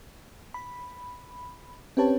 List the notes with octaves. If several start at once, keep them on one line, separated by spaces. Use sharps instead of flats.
B5
C4 C#4 G4 B4 C#5 A5